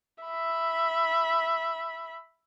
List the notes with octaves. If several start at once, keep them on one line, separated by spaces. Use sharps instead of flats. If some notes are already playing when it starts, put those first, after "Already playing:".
E5 B5